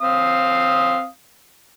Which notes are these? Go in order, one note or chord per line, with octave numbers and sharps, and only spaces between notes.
C4 F5 D#6